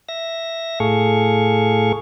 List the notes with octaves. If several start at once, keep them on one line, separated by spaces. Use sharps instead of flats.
E5 A#6
A2 G#4 A4 F5 C#6